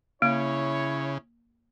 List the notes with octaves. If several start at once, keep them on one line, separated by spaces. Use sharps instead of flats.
C#3 A#3 E4 C#5